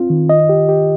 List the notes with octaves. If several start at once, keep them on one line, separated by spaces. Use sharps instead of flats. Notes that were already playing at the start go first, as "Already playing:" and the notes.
Already playing: C4 F4
D#3
D#5
G4
G4